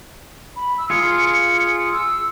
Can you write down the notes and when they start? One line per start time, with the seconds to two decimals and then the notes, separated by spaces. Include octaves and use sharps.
0.56 B5
0.78 E6
0.90 F4 G#4 C#7
1.16 C#7
1.93 E6